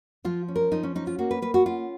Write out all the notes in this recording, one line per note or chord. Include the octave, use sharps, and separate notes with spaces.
F3 F4
C#4
A#4
F3 D#4
C#4
C#4 D#4
F4
A#3 F#4
B4
A#3 B4
F#4
C#4 F4